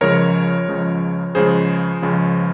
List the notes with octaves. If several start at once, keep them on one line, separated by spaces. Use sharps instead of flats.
C#2 C#3 F3 G#3 A#4 C#5
C#2 C#3 F3 G#3
C#2 C#3 F3 G#3 G#4 C5
C#2 C#3 F3 G#3